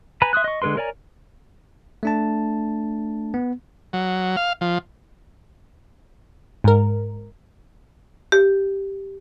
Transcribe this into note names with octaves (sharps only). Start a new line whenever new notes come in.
B4 G#5 A#5 B5
E5 C6 D#6 F#6
D#5 C#6
D3 G#3 A#4 B4 C6
A#4 C#5 D5 G#5 A#5
A3 D4 A5
B3
F#3
F5
F3
G#2 A#4
G4